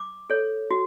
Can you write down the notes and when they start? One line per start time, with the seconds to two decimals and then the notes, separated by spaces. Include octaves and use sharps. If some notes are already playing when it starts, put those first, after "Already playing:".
Already playing: D6
0.30 A4 C#5
0.71 F#4